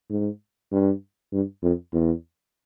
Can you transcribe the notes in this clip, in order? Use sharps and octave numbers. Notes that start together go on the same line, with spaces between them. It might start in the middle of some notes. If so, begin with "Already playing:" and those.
G#2
G2
G2
F2
E2